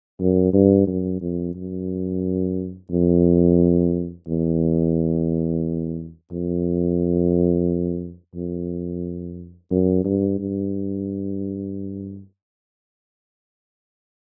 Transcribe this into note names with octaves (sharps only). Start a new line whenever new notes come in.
F#2
G2
F#2
F2
F#2
F2
E2
F2
F2
F#2
G2
G2